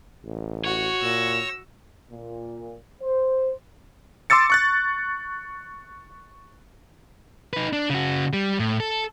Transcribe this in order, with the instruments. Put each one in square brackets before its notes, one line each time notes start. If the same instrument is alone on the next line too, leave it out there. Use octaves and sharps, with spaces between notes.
[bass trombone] A1
[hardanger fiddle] F#4 [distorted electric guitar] C#5
[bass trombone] A#2 [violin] E6 A#6
[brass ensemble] A#2
C5
[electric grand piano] C6 D6 E6 A6 C#7
C#6 F#6 A6
[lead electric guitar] D#4 B4
D4
C#3 F#4
G3
A2
A4